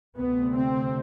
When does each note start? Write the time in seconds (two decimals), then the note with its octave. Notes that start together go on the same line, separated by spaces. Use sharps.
0.17 D2 C3 B3
0.55 C4